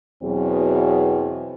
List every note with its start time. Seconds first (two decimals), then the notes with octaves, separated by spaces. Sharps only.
0.23 E2 B2 F#3 C4 G#4